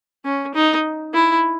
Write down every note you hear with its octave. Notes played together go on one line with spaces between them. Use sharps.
C#4
D#4
E4